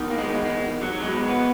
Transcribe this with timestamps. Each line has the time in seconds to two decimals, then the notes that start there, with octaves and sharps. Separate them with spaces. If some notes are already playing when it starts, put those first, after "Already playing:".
Already playing: E2 D#3
0.10 A#3
0.17 G#3
0.45 G#3
0.82 F#3
0.92 F#3
1.01 E2 B2 G#3
1.29 B3